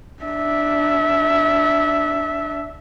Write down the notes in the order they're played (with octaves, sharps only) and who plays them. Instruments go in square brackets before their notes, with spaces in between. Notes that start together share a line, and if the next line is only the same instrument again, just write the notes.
[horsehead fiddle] D4 E5